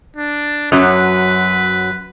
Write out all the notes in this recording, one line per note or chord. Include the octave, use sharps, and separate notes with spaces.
D4
F#2 F#3 B4